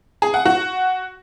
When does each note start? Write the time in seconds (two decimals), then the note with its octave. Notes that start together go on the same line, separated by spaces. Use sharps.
0.22 G#4
0.34 F#5
0.46 F#4